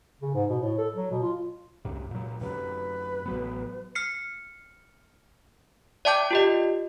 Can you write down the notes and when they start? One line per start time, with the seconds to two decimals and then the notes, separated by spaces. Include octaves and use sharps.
0.21 C#3
0.34 G#2
0.50 B2
0.61 A2
0.78 A4
0.95 F#3
1.11 B2
1.22 F4
1.85 C2 F#2 C3
2.11 A#2 F#3
2.41 F#2 C3 F#3 B4
3.26 A1 F#3 B3
3.95 F6 C7 C#7
6.05 D5 E5 G5 A5 D6 G6
6.31 F4 G4 D#5